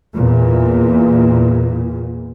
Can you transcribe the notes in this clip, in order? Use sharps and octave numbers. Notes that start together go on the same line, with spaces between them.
E2 A#2